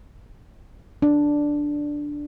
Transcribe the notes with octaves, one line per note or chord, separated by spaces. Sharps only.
D4